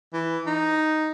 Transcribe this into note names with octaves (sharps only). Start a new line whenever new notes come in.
E3
D#4